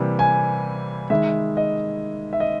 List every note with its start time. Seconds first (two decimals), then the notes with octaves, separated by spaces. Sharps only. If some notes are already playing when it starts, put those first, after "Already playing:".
Already playing: C3 E3 G3 A#3
0.19 G#5
1.10 D#3 G#3 E5
1.57 D#5
2.33 E5
2.40 D#5